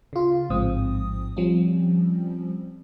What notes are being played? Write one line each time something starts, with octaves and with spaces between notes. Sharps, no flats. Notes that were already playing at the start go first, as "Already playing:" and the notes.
C#3 F4
A1 G#2 F3 C4 D#6
F3 G3 C4 C#4